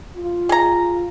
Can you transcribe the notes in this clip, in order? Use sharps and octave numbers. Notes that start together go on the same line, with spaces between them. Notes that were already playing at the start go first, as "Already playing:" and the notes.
F4
G#4 A#5